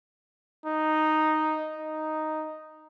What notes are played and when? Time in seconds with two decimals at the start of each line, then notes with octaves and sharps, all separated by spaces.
0.66 D#4
1.76 D#4